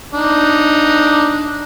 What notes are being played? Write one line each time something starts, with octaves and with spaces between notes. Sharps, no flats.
D4 D#4